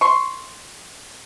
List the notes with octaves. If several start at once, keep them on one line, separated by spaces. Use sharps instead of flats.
C6 C#6